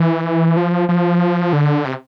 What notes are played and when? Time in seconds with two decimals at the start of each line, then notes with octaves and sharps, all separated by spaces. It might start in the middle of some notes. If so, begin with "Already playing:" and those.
Already playing: E3
0.57 F3
0.89 F3
1.53 D3
1.85 C3